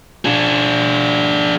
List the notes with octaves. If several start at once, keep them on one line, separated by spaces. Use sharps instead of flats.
D4 G#4